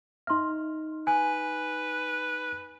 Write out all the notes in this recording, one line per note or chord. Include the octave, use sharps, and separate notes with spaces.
D#4 E5 C6 F6
B4 G#5